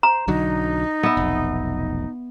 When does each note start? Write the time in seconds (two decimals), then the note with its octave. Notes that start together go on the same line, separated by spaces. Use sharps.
0.03 C5 A#5
0.28 B1 D3 F#3 D#4
1.03 B3 E5
1.17 F1 B1